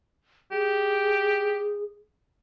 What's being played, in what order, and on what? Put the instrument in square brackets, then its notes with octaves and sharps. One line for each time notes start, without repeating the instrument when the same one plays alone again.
[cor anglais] G4 [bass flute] G#4